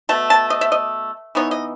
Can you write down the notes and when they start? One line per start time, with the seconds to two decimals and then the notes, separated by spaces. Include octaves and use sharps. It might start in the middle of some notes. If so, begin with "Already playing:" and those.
0.09 B2 A3 A5
0.30 A5
0.50 D#5
0.61 E5
0.72 D#5
1.35 E3 B3 D#4 C#5
1.51 D#5